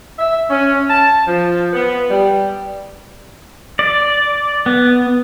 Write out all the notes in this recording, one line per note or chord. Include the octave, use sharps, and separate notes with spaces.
E5
C#4
A5
F3
B3
G3
D5
B3